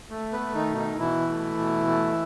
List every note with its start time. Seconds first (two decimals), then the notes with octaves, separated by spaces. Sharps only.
0.10 A3
0.33 B3 B4
0.40 A3
0.54 D#3 D#4
0.70 B2
0.77 D#3 D#4
0.99 B2 E3 E4
1.29 A3
1.58 B2
1.88 A3